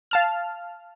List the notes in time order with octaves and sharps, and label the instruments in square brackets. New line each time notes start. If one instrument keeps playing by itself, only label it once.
[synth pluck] F5 A5 F6